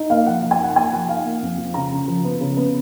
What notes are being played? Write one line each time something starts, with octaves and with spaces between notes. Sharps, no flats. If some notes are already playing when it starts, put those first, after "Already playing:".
Already playing: D#4
A#3 F5
F3 F#5
F3
G#5
D#4 F#5
A#3 G#5
F3 F#5
D#4 F5
A#3
F2
F3
C#3 A#5
C#3
F3
B3
C#3
B3